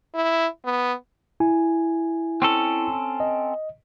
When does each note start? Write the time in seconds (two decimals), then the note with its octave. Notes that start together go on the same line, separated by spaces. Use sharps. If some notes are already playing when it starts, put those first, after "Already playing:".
0.15 E4
0.65 B3
1.40 E4 G#5
2.42 C4 C#4 A4
3.20 D#5